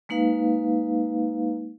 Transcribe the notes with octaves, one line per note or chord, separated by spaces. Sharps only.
G#3 A#3 D#4 B4 F5